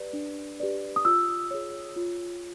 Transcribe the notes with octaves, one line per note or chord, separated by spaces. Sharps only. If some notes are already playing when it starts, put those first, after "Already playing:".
Already playing: G4 B4 D5
D4
G4 B4 D5
D#6
F4 E6
G#4 C#5
F4